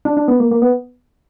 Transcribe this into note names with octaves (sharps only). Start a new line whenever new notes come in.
D4
D4
B3
A#3
A#3
B3